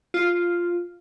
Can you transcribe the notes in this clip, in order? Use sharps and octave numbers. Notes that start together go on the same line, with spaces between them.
F4